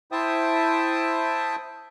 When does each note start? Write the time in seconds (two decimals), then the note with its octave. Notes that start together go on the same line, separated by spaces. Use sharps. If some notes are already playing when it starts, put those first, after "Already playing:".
0.12 E4 C5 E5 G5 A5 D#6